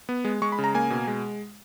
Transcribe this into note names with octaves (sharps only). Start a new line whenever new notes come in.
B3
G#3
G#3 C#6
B5
C#3
A#5
A#3 G#5
B2
G#3